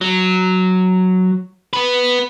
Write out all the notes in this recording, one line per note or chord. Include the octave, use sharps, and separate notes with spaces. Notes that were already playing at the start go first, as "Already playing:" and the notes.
F#3
B3 B4